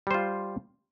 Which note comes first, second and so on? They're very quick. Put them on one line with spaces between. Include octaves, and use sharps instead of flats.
G3 C5 F4